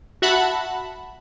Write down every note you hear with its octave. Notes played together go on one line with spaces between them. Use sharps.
F#4 E5 F#5 A5 B5